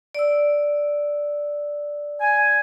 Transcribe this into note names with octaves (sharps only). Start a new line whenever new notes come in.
D5 E6
G#5